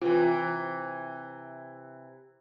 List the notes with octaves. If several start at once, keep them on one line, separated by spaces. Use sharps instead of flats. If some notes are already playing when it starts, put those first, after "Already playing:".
C3 E3 F4 B4